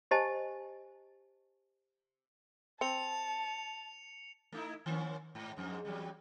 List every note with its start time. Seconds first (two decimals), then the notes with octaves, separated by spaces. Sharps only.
0.11 G4 C5 D#5 G#5 A5
2.81 C4 A5 C#7 F7
4.52 A3 D#4 E4
4.86 D#3 A#3 C#4
5.35 G#2
5.57 F2 G#2
5.85 E2 F#3 G3